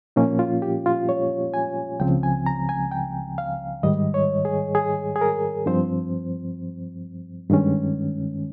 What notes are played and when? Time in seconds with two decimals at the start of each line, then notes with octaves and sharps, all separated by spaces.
0.16 A#2 F3 A#3 C#4 D#4
0.39 F4
0.62 G4
0.86 F4
1.09 C#5
1.54 G#5
2.00 C#2 C#3 F3 C4 G5
2.23 G#5
2.46 A#5
2.69 G#5
2.91 G5
3.38 F5
3.83 G#2 D#3 G3 D#5
4.14 C#5
4.45 G#4
4.75 G#4
5.16 G#4
5.21 A#4
5.66 G2 F3 C4 C5
7.50 G2 D#3 G#3 C#4